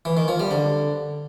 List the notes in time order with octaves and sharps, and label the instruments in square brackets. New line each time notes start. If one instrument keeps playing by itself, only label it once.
[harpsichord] E3
D#3
F3
G3
D3